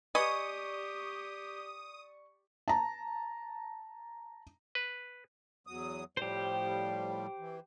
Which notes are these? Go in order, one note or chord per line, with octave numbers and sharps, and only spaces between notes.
G4 B4 D5 D#5 G#5 C#6 D#6 C#7
A5 A#5
B4
E2 F#3 D#6
A2 F3 G3 G4 C5
E3